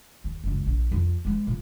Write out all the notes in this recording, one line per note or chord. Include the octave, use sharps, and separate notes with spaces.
D#2
F#1 C#2
A#1
F2
E3 G#3
A#2